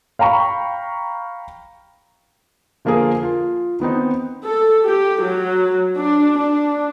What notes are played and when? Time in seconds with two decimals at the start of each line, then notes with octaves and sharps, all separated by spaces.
0.19 F5 G5 A#5 B5 C#6
2.85 D3 F3 A#3 F4 G#4 A#4
3.23 F4
3.80 D#3 B3 C4 D#4
4.44 A4
4.85 G4
5.22 F#3
5.98 D4
6.38 D4